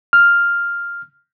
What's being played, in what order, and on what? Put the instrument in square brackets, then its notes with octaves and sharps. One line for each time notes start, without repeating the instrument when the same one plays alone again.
[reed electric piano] F6